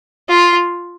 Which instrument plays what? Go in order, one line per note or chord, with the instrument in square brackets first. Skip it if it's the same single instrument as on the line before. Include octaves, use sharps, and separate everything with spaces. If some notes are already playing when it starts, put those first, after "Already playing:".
[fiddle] F4